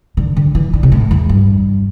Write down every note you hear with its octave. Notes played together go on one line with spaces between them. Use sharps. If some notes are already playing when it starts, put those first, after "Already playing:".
D3
D3
E3
D3
C3
A2
E2
G2